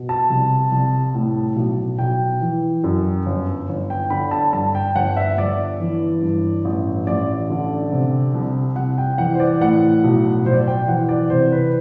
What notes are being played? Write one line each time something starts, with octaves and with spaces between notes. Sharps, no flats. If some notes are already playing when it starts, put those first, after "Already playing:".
Already playing: B2
A5
C2
C2
A2
B1
B1 G5
E3
F#2
G1
G1
G5
D3 B5
A5
G2 A5
G5
G1 F#5
E5
G1 D5
E3
G2
A1
A1 D5
D3
C3
C2
C2 F#5
G5
E3 F#5
C5
D5
A2 F#5
B1
B1 C5
D5
C5
G5
E3 F#5
D5
C3 C5
B4